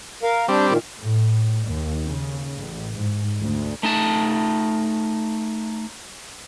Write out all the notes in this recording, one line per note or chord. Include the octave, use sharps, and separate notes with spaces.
A#4 F5
G3 C4 D4
A#2 D#3
A2
D#2
C#3
A1
G#2
D2
A3 D#4 A5